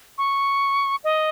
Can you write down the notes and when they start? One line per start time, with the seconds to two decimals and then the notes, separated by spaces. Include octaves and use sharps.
0.18 C#6
1.04 D#5